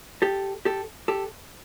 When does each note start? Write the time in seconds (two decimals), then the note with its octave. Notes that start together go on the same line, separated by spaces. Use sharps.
0.22 G4 A4
0.65 G4 A4
1.08 G4 A4